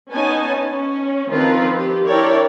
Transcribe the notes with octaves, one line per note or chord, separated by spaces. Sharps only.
B3 C#4 D#4 C#5 G#5 A5
C#4
D#3 F3 C4 F4 A#4 B4
G4
D4 E4 A#4 C#5 D5 G5